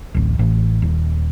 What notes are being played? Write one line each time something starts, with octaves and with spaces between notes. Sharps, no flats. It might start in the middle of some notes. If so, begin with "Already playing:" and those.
D1 A1
A1
D#1